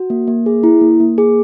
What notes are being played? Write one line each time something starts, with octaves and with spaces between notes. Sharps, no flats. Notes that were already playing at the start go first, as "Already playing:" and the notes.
Already playing: F#4
A#3
A#3
G#4
E4
A#3
A#3
G#4